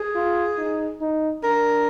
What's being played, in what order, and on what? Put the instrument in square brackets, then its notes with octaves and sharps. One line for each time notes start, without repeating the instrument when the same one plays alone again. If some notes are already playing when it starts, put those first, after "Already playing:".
Already playing: [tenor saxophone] G#4
[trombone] F4
D#4
D#4
[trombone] D4 [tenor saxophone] A#4